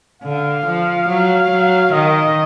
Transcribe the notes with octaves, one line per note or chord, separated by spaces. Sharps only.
D3 F5
F3
F#3
F#3
D#3 D#5